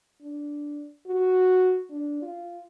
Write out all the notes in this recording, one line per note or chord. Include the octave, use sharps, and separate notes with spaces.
D4
F#4
D4
F4